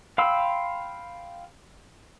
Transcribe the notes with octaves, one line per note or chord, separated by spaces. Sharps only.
F5 G5 B5 C6 E6